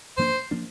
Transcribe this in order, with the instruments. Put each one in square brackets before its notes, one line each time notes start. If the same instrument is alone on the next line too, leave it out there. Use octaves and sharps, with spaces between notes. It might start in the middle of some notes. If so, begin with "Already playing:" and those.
[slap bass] G#2 F3 A#3 D4 [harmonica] C5
[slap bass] F3 A#3 D4